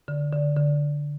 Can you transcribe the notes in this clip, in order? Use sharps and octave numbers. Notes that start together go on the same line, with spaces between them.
D3
D3
D3